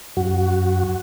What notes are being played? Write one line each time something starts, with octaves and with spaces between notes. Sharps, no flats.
F#2 F#4